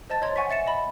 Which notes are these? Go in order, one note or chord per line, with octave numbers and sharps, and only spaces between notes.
C5 D#5 A5 A6
C#5 D#5 A#5 C6 G#6
F#5 G#5 C#6 A6 B6
E5 A6 C#7 E7
D#5 B5